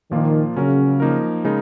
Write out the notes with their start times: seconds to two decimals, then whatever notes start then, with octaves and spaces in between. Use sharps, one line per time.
0.11 A#2 D#3 F3 A#3 F4
0.56 C#3 F#3 C#4 F#4 A#4
1.00 F3 A#3 D#4 A#4
1.44 C#3 G#3 D#4 A#4